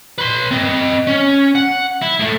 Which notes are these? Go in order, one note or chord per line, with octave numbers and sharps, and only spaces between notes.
B4 C6
C4 D#5
C#4
F#5
E4
A2 A3